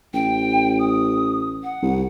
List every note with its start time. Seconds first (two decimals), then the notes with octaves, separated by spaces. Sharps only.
0.14 A1 G5
0.79 D#6
1.63 F#5
1.82 C2